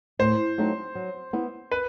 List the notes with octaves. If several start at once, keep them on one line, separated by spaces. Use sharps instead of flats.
A2 C5
F#3 A3 C4 D#4
F#3
B3 E4
B4